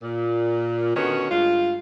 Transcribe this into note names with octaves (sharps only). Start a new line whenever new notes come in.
A#2
D3 D#3 B3 C#4 F#4
G2 G#3 F4